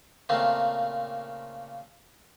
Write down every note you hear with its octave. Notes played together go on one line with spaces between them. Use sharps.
A#2 C#3 A3 A#3 C4